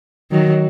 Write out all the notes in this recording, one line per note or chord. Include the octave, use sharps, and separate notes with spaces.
D#3 F#3